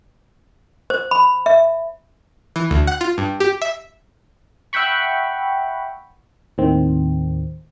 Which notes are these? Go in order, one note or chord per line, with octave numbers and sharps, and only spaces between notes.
C5
B5
E5
E3
D2
F#5
F4
G2
G4
E5
E5 F#5 G5 B5 C#6
D#2 A2 D#3 C4